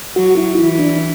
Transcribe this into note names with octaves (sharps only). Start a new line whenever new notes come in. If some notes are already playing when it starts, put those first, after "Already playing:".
F#3 F#4
E4
E3 E4
D4